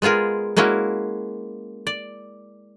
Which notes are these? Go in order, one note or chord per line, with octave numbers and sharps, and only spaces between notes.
G#3 B3 F4 G#4 A#4
G#3 A#3 C#4 E4 F#4
D5